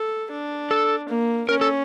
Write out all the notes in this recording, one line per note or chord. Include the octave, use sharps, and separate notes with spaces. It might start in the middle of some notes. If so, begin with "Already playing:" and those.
Already playing: A4
D4
A4
A#3
C#4 A#4
A4